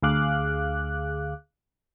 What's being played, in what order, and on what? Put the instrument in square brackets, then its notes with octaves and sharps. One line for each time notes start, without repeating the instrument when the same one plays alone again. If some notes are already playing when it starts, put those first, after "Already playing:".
[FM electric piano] D2 G#4 F5 D6 F#6